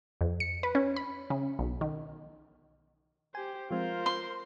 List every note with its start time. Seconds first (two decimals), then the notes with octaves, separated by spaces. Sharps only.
0.21 F2
0.40 C#7
0.63 B4
0.75 C#4
0.96 B5
1.30 C#3
1.59 B1
1.81 D#3
3.35 G4 C5 G#5
3.71 F3 G#3 C4 F4 A#4 C5
4.06 C6